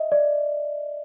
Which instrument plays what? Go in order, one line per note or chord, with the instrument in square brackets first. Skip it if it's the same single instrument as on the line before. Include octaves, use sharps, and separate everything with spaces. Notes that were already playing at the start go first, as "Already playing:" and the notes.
Already playing: [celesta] D#5 E5
D5